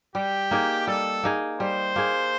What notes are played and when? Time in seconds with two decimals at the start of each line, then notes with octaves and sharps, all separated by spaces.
0.15 G3 G4
0.51 A#3 D#4 G#4
0.87 G3 A4
1.23 A#3 D#4 G#4
1.59 G3 C5
1.96 A#3 D#4 G#4